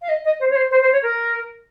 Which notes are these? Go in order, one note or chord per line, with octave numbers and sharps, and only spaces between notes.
F5
D#5
D#5
C5
C#5
C5
C5
C5
C#5
A#4